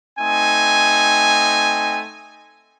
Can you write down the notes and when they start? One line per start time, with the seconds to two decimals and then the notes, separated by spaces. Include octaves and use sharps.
0.20 A3 C4 D#4 G#5